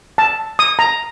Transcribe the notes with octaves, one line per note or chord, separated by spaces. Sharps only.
A5
D#6
A#5